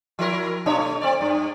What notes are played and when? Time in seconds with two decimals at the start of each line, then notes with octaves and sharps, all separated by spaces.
0.19 F3 E4 A#4
0.66 B2 D4 C#5
0.78 A3
1.01 C4 D5
1.21 G2